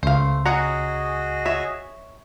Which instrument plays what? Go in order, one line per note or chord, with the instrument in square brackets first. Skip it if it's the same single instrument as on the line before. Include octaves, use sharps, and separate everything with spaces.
[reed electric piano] C#2 [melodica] A3 [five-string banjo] C5 F5
[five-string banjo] C#4 F#5 A#5 [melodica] F#4 G#4 D#5
[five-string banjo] C#5 E5